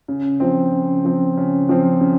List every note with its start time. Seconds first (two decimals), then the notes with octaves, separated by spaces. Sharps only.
0.08 C#3
0.40 F3 C4
0.72 C#3
1.05 F3 C4
1.37 C#3
1.69 F3 C4
2.01 C#3